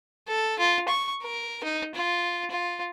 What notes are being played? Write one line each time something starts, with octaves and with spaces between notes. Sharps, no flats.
A4
F4
C#6
A#4
D#4
F4
F4